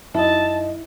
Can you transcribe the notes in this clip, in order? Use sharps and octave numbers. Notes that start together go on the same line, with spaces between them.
F#2 D#4 E4 D#5 A5